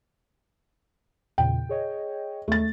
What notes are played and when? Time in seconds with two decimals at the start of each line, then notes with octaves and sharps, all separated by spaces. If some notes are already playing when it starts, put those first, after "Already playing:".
1.38 E2 A#2 C#3 G5
1.69 G#4 C#5 D#5
2.48 D#2 A3 A6